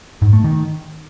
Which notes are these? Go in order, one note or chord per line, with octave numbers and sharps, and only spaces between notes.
G#2
A3
D#3